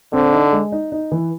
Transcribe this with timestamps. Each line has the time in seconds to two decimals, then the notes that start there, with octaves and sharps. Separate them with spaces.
0.13 D3 C4
0.32 D#4
0.52 G#3
0.72 D#4
0.92 D#4
1.12 E3